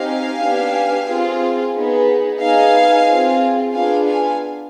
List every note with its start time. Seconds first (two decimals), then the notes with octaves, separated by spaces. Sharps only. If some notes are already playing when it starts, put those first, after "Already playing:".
Already playing: C4 D#4 G4 F5 G#5
0.42 B3 D4 G4
1.09 C4 F4 G#4
1.75 B3 D#4 G#4
2.42 B3 D#4 G#4 F5 G#5
3.08 C4 F4 G#4
3.73 B3 D4 F4 G#4 F5 G#5
4.07 F5 G#5